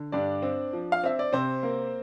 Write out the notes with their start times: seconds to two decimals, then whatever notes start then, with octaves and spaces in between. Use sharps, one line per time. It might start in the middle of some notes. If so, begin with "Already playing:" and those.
Already playing: D3
0.12 G2 D4 D5
0.42 C4
0.73 F3
0.92 F5
1.03 C4 E5
1.19 D5
1.33 C3 C4 C5
1.63 A#3